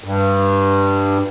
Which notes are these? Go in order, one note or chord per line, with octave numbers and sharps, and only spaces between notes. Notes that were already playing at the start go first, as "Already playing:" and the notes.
G2